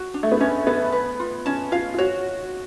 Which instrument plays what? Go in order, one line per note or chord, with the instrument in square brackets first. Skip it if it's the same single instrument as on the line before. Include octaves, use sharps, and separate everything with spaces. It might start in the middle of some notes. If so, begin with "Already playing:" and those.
Already playing: [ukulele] F#4
D4
[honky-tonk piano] A3
B3
[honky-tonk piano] C#4 [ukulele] D4
[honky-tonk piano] B3 [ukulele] A4
[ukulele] B4
F4
[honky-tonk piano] C#4 [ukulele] A5
[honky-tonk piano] F4 [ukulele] F5
[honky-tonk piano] F4
[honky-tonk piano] F#4 [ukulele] C#5